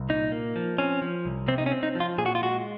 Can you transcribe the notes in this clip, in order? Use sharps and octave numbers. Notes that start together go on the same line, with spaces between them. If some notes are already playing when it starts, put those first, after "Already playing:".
Already playing: C2
A#2 D#4
A#3
F3
C4 C#4
F3
C2
C3 C4
D#4
C#4
C4
D#4
F3
F4
A#2 G#4
F#4
F4
G#3 F#4